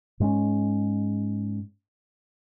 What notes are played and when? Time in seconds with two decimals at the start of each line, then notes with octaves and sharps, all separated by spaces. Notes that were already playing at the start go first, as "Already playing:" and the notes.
0.20 G#2 G#3 C4 C#4